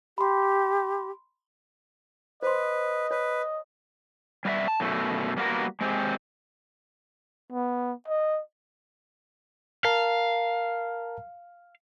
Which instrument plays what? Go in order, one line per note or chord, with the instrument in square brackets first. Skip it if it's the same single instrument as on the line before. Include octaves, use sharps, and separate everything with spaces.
[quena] G4 [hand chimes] B5 C6
[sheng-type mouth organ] B4 [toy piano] C5 C6 [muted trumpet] D#5
[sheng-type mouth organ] B4 [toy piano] C#5
[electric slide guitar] G3 B3 D#5 E5
A5
F#2 B2 A3
G3 A#3 B3 C#4 F#4 A#4
G#3 C4 G4
[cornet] B3
D#5
[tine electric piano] A#4 A5 A#5 [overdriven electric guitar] F5